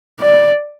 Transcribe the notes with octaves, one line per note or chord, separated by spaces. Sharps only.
D5